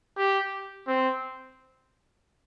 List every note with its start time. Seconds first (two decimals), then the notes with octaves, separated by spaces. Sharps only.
0.17 G4
0.87 C4